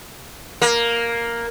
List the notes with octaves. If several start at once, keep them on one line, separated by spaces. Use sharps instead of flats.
A#3